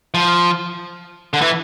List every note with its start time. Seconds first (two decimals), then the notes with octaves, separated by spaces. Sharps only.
0.14 F3
1.33 D3
1.41 E3